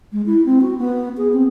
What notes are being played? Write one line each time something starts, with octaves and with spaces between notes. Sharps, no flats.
G#3
E4
C4
F#4
B3
G#4
C4